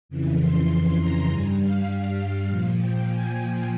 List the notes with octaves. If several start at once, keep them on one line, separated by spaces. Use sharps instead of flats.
F2 C#3 E3
C6
C6
A#5
G2 G3 G#5
F5
A#2 F3
G5
G#5
G5